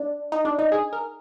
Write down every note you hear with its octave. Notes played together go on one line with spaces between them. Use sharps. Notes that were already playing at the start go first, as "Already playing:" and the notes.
Already playing: D4
D#4
D4
D#4
G#4
A#4